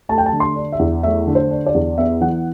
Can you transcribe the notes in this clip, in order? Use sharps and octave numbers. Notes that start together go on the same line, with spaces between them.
A3 A5
G5
A5
D3
C6
D4
E5
E2
A3 E5
D3
C5
D4
D5
E2
B3 E5
E3 F#5